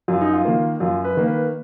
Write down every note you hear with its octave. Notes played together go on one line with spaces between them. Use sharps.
F#2 F4
D#4
F4
D#3 A#3
F#2 F4
B4
D#3 A#3
B4